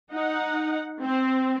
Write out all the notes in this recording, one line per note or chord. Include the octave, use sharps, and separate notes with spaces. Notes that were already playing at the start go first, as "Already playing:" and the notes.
D#4 F#5
C4